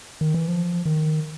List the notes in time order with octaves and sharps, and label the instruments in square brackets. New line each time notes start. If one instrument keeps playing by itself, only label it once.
[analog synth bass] D#3
E3
F3
D#3